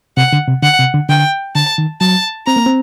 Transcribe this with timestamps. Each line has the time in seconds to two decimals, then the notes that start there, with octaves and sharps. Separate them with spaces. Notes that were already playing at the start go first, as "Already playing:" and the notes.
0.17 C3 F#5
0.33 D3
0.48 C3
0.63 D3 F#5
0.79 C3
0.94 D3
1.09 D3 G5
1.55 D3 A5
1.78 D#3
2.01 F#3 A5
2.47 C4 A#5
2.56 A#3
2.66 C4